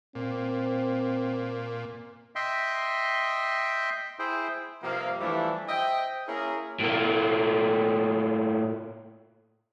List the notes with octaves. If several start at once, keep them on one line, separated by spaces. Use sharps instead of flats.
A#2 C4
D#5 E5 G5 C6
E4 G#4 C5 G5
G2 C3 F3 A#3 F5
E3 F3 G3 A3 D4 E4
C5 D#5 E5 G5
A#3 C#4 E4 G#4 A#4
A2 A#3